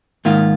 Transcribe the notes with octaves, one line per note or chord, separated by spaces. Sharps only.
G#2 D#3 A#3 F4